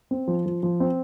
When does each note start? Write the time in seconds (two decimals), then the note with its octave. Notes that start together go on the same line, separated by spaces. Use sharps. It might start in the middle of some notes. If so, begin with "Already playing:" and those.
0.11 C4
0.28 F3
0.46 F3
0.63 F3
0.80 C4